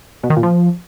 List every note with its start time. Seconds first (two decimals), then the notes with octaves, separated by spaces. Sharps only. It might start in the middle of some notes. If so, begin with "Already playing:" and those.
0.23 B2
0.30 D#3
0.37 A#2
0.43 F3